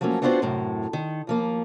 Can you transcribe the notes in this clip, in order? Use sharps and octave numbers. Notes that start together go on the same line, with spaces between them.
F3 F#3 A3 A#3 C#4
B3 C4 D4 F4 F#4 C5
F#2 A2 C3
D#3
D#2 F3 A#3